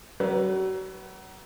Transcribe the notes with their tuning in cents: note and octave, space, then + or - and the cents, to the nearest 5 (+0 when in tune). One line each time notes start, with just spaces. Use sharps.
F#3 +35 F#4 +30 B4 +0